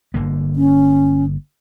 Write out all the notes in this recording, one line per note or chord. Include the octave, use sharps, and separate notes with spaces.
G1 D3 A#3
C#4